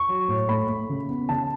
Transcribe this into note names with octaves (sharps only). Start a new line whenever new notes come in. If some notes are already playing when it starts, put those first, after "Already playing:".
Already playing: C#6
F#3
A2
A3 B5
A3
C#3
B3
C#3 A5